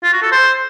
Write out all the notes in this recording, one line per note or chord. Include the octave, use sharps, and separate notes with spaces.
F4
F#4
A4
C5